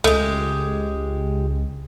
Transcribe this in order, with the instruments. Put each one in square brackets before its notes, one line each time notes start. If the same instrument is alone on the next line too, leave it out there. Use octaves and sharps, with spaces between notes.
[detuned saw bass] C#2 [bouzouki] G#3 G4 [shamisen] A3